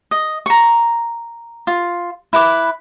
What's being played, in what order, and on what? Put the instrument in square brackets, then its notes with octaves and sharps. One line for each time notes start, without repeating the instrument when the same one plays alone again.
[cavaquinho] D#5
A#5 C#6
F4
E4 B4 D6